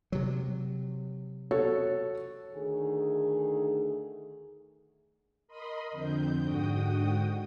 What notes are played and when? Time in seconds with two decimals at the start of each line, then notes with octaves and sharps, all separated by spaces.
0.12 C3 F#3
1.51 F#4 A4 C#5
2.54 D2 D#3 A3 G#4
5.47 A#4 D#5 B5 C6 D#6
5.91 F2 D3 C4 G6
6.41 G#2 D3 F#4 G5 D#6